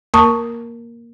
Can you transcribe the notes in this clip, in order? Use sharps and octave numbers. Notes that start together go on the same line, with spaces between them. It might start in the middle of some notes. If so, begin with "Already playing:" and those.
A#3 A#4 A5 C#6 D#6